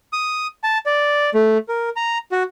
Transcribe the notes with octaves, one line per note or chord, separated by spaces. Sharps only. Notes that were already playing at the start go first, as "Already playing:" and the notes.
D#6
A5
D5
A3
A#4
A#5
F#4